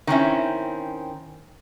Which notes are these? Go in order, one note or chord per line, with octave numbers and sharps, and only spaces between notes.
D#3 C4 C#4 E4